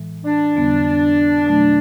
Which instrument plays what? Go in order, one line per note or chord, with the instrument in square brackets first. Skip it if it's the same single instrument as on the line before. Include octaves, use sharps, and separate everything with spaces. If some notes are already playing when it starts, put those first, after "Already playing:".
Already playing: [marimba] A2 E3 G#3
[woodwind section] D4
[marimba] F2 D3 G3 B3
B2 F#3 A3